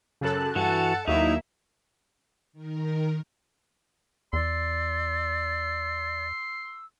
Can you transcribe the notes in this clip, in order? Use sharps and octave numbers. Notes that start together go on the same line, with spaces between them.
F#2 C#3 A4 A5 F#6
G2 E3 F#4 A4 F#5 A6 C#7
D#2 F#3 A#3 D#4 E4 E5
D#3 A#4
E2 D5 C6 E6